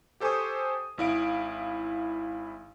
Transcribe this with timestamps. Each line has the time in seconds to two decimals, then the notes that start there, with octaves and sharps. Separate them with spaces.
0.20 G4 A4 C5 G#5 C#6 D#6
0.98 G#1 E4 F5 D7